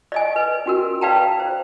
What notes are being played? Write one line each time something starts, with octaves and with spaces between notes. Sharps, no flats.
D5 D#5 G#5
B4
C#4 F#4 A#4
B4 D5 F5 G5 A5 A#5
C5